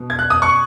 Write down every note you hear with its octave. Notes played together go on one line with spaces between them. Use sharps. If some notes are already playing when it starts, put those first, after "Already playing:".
Already playing: B2
G#6
F#6
D#6
C#6